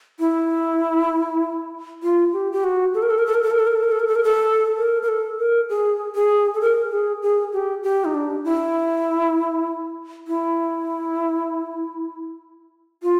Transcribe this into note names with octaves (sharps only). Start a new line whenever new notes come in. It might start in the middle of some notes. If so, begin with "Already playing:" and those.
E4
F4
G4
G4
F#4
A4
A#4
A4
A#4
A4
A#4
A4
A#4
A4
A#4
A4
A#4
A4
A#4
A4
A#4
A4
A#4
A#4
A4
A#4
G#4
G#4
A4
A#4
G#4
G#4
G4
G4
D#4
D4
E4
E4
F4